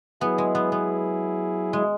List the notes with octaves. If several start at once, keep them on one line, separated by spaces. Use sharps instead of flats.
F#3 B3 E4 G#4
G#3
B3
B3
G#3